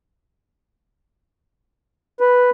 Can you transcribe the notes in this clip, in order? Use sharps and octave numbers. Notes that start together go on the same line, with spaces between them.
B4